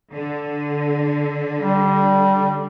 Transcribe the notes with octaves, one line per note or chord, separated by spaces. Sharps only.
D3
G3